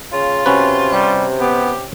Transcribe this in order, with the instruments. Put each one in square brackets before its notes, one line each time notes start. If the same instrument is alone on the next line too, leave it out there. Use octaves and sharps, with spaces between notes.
[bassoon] C#3 [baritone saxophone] F4
[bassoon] C3 [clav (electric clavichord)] C#4 F#4 B4
[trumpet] G3
[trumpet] B3 [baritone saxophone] G4